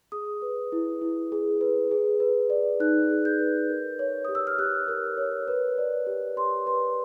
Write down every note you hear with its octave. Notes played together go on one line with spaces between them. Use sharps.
G#4 D#6
B4
E4
E4
G#4
B4
G#4
B4
D5
D#4 F#6
G#4
G6
B4
A#4
C#5
G4 D#6
E6
F6
G4 F#6
A#4
C#5
B4
D5
G4
G4 C6
B4 C6